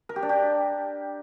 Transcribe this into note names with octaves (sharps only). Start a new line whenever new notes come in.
A#4
G4
D4
G4